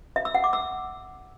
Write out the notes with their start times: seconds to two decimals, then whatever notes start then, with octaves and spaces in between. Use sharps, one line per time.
0.16 E5
0.25 E6
0.35 F#5
0.44 D6
0.53 E6